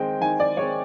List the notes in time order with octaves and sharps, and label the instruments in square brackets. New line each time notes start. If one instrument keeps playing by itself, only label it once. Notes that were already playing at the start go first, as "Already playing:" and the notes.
Already playing: [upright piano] D#3 G#3 C4 G5
D#3 G#5
D5
G#3 C4 C#5